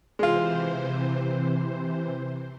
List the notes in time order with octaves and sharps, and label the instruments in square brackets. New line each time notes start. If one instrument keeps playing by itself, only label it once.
[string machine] C3 E3 C5 [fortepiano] G#3 F4